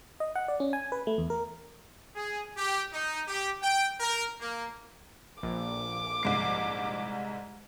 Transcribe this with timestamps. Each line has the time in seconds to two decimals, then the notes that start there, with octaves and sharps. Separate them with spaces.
0.20 D#5
0.35 F#5
0.48 D5
0.60 C#4
0.73 G#5
0.92 B4
1.07 A3
1.18 E2
1.30 A#4
2.15 G#4
2.56 G4
2.92 D#4
3.28 G4
3.62 G5
4.00 A#4
4.40 A#3
5.43 A#1 D6
6.23 C2 G#2 C7